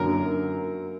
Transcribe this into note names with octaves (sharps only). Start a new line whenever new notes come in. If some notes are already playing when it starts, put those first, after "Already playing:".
Already playing: F#2 D3 F#3 A#3 A#4